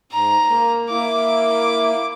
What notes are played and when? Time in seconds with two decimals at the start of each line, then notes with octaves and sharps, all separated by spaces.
0.12 G#2 A#5
0.48 A#3
0.90 A#3 E4 D6